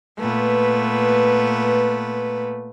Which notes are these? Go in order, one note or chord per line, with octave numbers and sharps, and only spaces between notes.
A#2 A3 B3 B4